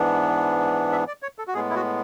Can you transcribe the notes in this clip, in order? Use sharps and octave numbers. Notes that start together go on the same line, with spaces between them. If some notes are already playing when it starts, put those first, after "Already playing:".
Already playing: G#2 E3 B3 D4
E5
D5
C#5
A4
F#4
A2 G#3 B3 G#4
E4
F#4